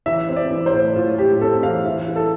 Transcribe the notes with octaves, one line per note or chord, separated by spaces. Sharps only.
E3 E5
C4
D5
E3
C5
A2
A2 F4
A2 G4
C4 A4
E3 F5
E3 E5
E3
A4